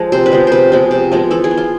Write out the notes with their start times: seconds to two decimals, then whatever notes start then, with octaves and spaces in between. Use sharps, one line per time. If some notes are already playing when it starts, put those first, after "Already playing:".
Already playing: F3 G#3 A4
0.12 C3 C5
0.26 B4
0.32 F3 G#3 B3
0.47 C3 B4 C5
0.72 F3 G#3 B3
0.91 C3
1.12 F3 G#3 B3
1.31 E3 A4
1.44 G#4
1.51 B3
1.57 F4